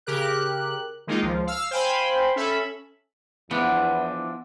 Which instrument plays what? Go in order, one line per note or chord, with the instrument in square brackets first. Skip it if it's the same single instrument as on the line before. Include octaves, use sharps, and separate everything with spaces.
[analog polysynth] C#3 G4 A#4 F#6
D#3 G#3 A#3 D#4 F4
C#2 F3
F5 E6 F6
C5 F5 G5 G#5 B5 C6
C#4 A4 E5 B5
[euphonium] E2 [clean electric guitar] E3 F3 D4 [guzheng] B3